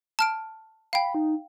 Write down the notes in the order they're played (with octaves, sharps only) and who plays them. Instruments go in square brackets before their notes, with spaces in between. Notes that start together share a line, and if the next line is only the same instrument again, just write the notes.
[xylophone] A5 F6 D7
[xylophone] F5 G5 [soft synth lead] B5
[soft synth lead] D#4